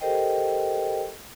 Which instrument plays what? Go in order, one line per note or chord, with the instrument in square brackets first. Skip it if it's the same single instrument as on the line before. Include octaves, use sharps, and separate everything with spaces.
[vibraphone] G4 A4 A#4 C5 D#5 G5